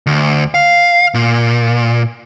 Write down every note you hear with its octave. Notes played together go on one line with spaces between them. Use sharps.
D2
F5
A#2